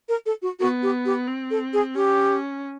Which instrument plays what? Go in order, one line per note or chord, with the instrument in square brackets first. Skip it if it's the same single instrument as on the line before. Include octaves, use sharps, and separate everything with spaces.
[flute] A#4
A4
F#4
[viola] B3 [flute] F#4
[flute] G4
G4
[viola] C4
[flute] A4
G#4
[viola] C#4 [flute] G4